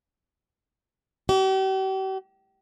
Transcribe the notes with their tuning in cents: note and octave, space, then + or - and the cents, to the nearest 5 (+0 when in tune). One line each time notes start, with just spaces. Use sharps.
G4 -45